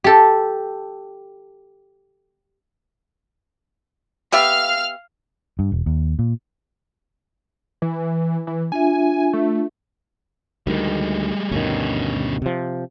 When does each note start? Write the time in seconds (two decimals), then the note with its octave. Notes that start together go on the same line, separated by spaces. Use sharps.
0.04 G4 A4
4.32 B3 G4 E5 F5 F6
5.59 G2
5.72 E1
5.86 D#2
6.19 A#2
7.82 E3
8.47 E3
8.72 D4 F4 E5 G#5
9.33 A3
10.67 D2 D#3 G3 G#3
11.51 D2 G2 B2 D#3 C#4
12.42 C3 F3